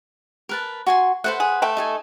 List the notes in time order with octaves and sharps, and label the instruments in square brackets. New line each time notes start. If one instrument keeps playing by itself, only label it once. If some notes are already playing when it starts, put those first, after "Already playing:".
[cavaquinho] A#4 B4 A5
F#4 G#5 C6
[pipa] A3 [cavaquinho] B4 C5 F#5
[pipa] G#4
A3 G5
[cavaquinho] D#4 A4 G#5